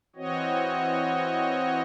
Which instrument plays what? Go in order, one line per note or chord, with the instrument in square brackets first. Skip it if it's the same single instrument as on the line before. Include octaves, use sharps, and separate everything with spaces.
[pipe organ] E3 C4 F#4 C#5 D#5